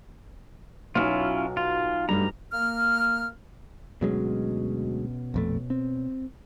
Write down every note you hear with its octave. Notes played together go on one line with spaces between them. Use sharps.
B1 F#3 C#4 E4 F4 C#5 F6
F4
G2 G3 A3 A#5
A#3 F6
D2 B2 F#3 G#3 C#4
A#1 F2 A3
C4